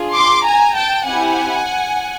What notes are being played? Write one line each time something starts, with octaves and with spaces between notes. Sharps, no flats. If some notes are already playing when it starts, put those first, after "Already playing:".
Already playing: D4 F4 G#4
C6 D6
G#5 A#5
G5 A5
C4 E4 G4 F#5 G#5